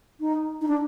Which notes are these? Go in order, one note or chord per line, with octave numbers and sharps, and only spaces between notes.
D#4
D#4
D4